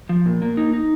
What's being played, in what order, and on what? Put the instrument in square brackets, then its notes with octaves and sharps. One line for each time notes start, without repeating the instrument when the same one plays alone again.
[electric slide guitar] F3
A#2
A#3
D#4
D#4